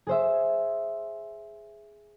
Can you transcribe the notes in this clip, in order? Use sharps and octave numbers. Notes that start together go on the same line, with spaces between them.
G#4 C5 E5